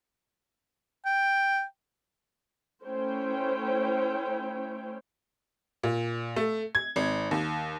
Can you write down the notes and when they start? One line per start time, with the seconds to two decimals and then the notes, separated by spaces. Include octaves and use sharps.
1.05 G5
2.83 A3 C#4 E4 C5 C#5 G5
5.83 A#2
6.36 A3
6.75 G#6
6.96 G#1
7.31 D#2